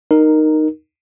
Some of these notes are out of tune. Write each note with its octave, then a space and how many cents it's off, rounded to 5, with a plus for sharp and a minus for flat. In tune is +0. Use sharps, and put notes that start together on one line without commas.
D#4 -10 A#4 +0